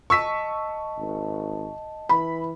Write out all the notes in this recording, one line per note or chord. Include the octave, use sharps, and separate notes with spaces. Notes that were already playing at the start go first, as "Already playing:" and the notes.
D#5 A5 C#6 E6 B6
G#1
E3 B5